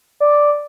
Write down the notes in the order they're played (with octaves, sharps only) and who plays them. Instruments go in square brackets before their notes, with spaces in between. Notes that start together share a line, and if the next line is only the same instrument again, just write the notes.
[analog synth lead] D5